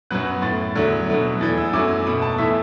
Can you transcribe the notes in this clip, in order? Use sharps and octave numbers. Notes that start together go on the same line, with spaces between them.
F#2 F#3 B3 F#6
A2 A3 A6
E2 D3 F#3 A3
B2 F#3 A3
E2 E3 A3 A6
E6
F#2 F#3 A3 D6
B2 A3 B5
A5
A2 E3 A3 E5